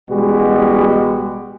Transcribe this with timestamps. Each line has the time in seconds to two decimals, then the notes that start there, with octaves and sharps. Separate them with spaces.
0.10 A1 B2 G3 G#3 F#4